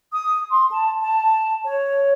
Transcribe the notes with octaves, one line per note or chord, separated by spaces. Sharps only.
D#6
C6
A5
A5
C#5